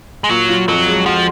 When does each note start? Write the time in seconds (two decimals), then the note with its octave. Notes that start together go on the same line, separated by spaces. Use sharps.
0.24 G#3
0.29 A#2 F#3
0.49 F4
0.68 F2 F#3
0.87 G#3
1.06 F3 F#4